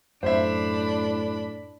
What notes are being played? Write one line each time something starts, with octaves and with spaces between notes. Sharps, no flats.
F#2 A2 D4 C5 E5 B5